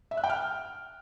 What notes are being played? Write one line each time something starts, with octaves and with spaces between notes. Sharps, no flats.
E5
F#6
G5
F6